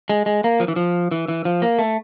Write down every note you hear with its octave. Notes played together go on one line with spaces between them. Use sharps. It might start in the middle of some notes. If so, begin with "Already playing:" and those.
G#3
G#3
A#3
F3
E3
F3
E3
E3
F3
A#3
A3